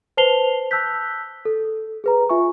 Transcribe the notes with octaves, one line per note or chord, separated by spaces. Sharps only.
B4 C5 A5 C7 F7 G7
A5 E6 F#6 G6 B6
A4
G#4 B4 A#5
F4 E5 G#5 C#6